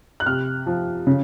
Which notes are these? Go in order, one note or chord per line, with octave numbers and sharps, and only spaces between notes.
F#6
C3 F6
F3
C#3